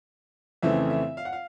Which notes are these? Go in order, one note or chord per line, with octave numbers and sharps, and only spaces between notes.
F2 C#3 E3 A3 C4 E5
E5
F5
F#5
F5